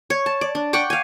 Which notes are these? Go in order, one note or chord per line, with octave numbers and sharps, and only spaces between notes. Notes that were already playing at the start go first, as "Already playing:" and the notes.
C#5
A5
D5
D4
F#5 G5 C#6 D6
F5 G#5